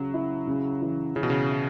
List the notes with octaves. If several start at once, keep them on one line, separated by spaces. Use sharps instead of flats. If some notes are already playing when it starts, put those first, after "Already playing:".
Already playing: C#3 F#3 C#4
E4
C#3
E3
C#3 E3
B2
C#3
E4